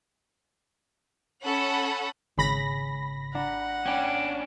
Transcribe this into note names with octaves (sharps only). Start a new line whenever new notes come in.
C#4 A4 F#5 B5
G#1 C#3 B5 A#6
D4 F#5 A#5
C#4 D4 G5